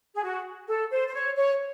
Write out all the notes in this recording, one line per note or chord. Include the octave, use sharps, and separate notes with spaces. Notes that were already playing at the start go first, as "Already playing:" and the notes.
G#4
F#4
A4
C5
C5
C#5
C#5